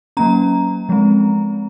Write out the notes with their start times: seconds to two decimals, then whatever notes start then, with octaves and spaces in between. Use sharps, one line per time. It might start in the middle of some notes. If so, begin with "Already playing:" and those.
0.17 F#3 A#3 C#4 A#5
0.89 F3 G#3 C4